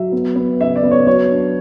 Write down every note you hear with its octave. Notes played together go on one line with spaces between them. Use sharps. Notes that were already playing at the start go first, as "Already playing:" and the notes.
Already playing: F#3 E5
B3
B3
C#3 E5
D5
B3
C#5
F#3 C#5
D4